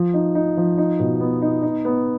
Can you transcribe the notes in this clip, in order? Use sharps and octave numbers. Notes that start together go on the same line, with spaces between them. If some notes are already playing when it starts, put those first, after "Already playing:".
Already playing: F3
D#4
D#4
F3
D#4
B2
B3
D#4
D#4
B3